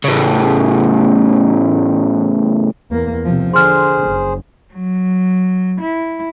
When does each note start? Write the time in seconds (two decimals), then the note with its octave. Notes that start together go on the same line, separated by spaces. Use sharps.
0.04 A2 C#3
2.91 E2 A#3
3.24 C3 F3
3.54 D3 G#4 C5 C6 F6
4.09 F#1
4.73 F#3
5.81 E4